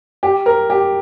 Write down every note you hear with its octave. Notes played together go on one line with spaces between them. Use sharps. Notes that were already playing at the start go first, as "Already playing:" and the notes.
G4
A#4
G4